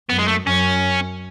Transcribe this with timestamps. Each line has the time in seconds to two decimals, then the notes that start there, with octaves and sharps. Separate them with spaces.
0.09 F#2 B3
0.19 G#3
0.28 A3
0.47 F#2 C#4